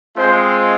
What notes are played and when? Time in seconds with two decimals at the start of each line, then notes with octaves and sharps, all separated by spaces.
0.17 G#3 C4 F4 C5